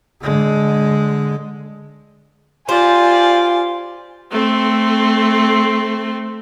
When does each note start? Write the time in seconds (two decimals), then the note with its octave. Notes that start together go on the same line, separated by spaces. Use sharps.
0.21 D3 G#3
2.69 F4 G4 C5 D5 G#5
4.32 A3 C4